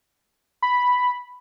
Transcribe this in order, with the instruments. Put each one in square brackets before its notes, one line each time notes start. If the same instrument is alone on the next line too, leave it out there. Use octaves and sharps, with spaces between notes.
[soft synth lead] B5